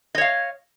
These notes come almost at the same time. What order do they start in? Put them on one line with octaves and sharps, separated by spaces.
D#5 C#5 F5